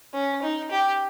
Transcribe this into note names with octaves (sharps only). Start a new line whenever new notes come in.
C#4
D#4
G4